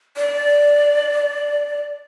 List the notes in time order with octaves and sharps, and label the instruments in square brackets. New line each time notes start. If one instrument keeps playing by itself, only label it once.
[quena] D5